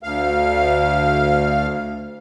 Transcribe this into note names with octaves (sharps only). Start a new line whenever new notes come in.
D2 F5